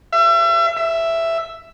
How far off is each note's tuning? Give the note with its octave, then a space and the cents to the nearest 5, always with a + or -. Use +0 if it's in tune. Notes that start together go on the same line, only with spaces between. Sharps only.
E5 +35
E5 +5